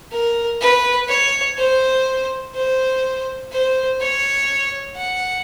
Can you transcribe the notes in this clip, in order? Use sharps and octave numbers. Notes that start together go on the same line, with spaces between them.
A#4
B4
C#5
C5
C5
C5
C#5
F#5